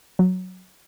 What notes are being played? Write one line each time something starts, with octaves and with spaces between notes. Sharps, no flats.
F#3